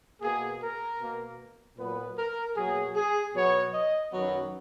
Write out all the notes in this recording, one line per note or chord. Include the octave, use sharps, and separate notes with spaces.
B2 A#3 G#4
A#4
B2 A#3
A#2 F#3 B3 B4
A#4
B2 F#3 A#3 G#4
G#4
B2 F#3 B3 C#5
D#5
F#2 D#3 F#3 B3